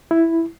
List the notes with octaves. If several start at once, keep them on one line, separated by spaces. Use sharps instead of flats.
E4